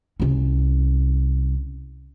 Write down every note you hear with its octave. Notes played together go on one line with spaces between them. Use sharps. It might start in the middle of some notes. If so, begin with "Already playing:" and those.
C2 C#4